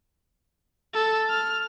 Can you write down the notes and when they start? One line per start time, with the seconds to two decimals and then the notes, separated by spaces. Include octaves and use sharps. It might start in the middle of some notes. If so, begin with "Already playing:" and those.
0.94 A4
1.30 F6